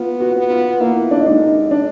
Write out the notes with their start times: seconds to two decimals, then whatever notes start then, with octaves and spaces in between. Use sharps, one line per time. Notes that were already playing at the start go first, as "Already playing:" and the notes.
Already playing: B3 F4
0.20 F#4
0.36 B3
0.50 F4
0.80 A#3 E4
1.11 D4
1.19 D#4
1.26 G#3 D4
1.42 D#4
1.71 D4